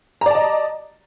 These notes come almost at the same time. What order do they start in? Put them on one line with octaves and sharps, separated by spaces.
A#5 D5 A5 D#5